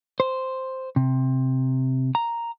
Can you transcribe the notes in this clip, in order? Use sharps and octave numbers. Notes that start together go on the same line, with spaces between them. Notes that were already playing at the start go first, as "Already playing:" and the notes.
C5
C3
A#5